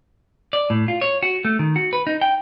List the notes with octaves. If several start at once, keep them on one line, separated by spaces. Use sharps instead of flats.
D5
A2
F4
C#5
F#4
A3
D#3
F#4
B4
D#4
G5